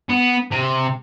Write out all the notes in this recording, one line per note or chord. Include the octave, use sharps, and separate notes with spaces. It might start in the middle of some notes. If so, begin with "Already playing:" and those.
B3
C3